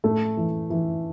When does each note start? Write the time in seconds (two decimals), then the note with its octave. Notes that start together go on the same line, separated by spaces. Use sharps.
0.04 A2 A3
0.37 E3
0.70 E3